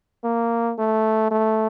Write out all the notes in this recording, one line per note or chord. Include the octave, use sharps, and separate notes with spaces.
A#3
A3
A3